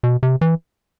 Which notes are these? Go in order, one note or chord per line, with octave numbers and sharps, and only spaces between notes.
B2
C3
E3